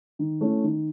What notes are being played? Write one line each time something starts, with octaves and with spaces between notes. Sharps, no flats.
D#3
A3 C#4 E4
D#3